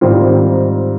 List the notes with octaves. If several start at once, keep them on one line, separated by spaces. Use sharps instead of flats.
G#2 D#3 G3 C4 F4